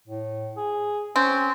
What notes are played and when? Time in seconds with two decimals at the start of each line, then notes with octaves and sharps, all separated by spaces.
0.07 A2
0.57 G#4
1.16 C4 C#4